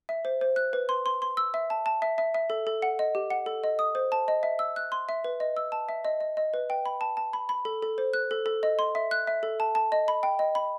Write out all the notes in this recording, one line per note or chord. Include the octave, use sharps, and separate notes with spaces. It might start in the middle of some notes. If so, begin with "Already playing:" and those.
E5
C5
C5
F#6
B4
C6
C6
C6
E6
E5
A5
A5
E5
E5
E5
A4
A4
F#5
D#5
G4
F#5
A4
D#5
D#6
C5
A5
D#5
E5
E6
F#6
C6
E5
B4
D#5
E6
A5
E5
D#5
D#5
D#5
B4
G5
B5
A5
A5
B5
B5
A4
A4
C5
F#6
A4
A4
D#5
C6
E5
F#6
E5
A4
A5
A5
D#5
B5
G5
D#5
B5